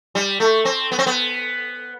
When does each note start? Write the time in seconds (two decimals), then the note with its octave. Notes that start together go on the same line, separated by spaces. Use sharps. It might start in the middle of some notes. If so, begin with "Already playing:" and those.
0.15 G3
0.40 A3
0.65 C4
0.92 B3
0.99 C4
1.07 B3